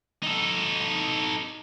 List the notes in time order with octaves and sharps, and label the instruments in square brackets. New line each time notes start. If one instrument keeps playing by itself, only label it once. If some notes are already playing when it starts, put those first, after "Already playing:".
[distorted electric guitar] D#4 A4